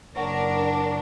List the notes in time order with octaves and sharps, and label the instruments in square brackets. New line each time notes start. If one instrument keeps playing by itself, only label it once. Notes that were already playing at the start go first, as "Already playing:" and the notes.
[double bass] F#1 [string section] D4 [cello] A#4 [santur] C#5 F#5